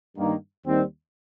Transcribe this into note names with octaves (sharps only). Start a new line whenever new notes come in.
G2 D#3 A#3
D#2 D#3 G3 C4 D#4